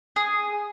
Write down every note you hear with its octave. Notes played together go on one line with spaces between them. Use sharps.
G#4